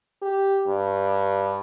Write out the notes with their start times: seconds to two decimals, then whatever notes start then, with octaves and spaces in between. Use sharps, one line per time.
0.22 G4
0.68 G2